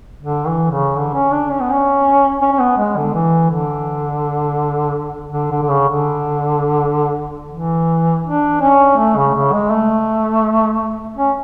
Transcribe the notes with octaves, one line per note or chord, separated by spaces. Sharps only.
D3
E3
C#3
D3
C#4
D4
C#4
B3
C#4
C#4
C#4
B3
G#3
D3
E3
D3
D3
D3
D3
C#3
D3
E3
D4
C#4
A3
C#3
C#3
G#3
A3
C#4